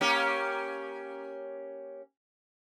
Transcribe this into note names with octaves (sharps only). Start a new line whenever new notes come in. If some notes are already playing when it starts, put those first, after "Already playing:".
A#3 C#4 G4